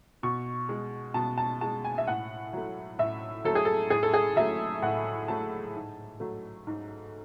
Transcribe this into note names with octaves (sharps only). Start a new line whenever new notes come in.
B2 C#6
G#3
B2 A5
A5
G#3 A5
G#5
E5
A2 F#5
F#3 A3
A2 E5
F#3 A3 A4
G#4
A4
A2 G#4
A4
G#4
F#3 A3 E5
A2 F#5
F#3 A3 A5
G#2
F#3 A3
G#2